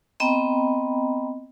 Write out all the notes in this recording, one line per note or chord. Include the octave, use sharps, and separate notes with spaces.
B3 C4 D#5 G5 A#5 B5